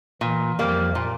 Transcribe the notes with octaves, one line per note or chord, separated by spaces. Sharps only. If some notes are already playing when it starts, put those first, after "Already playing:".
A#2 E3
F2 F3 G3 A#3
A#2